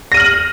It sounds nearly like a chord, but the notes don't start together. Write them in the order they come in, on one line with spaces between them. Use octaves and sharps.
A#6 D#7 F6 F#7